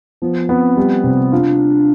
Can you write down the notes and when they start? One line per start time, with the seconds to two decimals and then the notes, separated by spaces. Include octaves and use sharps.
0.22 F3 B3
0.49 B3 C4
0.77 G3
1.04 C3
1.32 D4 F4